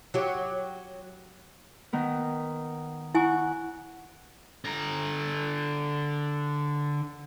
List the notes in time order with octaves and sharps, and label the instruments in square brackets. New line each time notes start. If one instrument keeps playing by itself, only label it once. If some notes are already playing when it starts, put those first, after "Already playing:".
[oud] F#3 G4
[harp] D#3 B3 A#4
[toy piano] E4 G#5 [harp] F#5 C#6
[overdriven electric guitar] D3 A#5